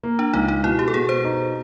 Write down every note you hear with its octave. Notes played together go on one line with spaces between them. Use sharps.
A#3
D4
C#2 D#4
D#4
B2 E4
G4
A4
B2 G#4
C5
D#4